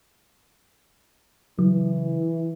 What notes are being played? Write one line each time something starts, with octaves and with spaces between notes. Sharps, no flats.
C#3 E3 F#3